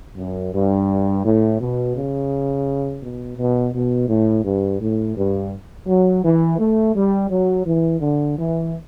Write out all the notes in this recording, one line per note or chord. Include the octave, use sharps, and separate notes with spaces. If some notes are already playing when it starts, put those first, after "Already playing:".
F#2
G2
A2
B2
C#3
B2
B2
B2
A2
G2
A2
G2
F#3
E3
A3
G3
F#3
E3
D3
E3